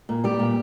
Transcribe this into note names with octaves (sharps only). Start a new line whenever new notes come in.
A#2
G3 G4
A#2